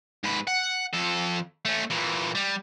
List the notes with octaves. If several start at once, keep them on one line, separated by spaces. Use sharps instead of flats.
G#2 B4
F#5
F2 A4
A3 C#4
A#2 E3
G3